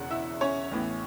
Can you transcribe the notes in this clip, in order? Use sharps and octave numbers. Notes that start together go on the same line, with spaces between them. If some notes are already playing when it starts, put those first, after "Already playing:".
Already playing: E1 E2 C#3 F#5
E4 E5
C#4 C#5
A1 A2 E3 B3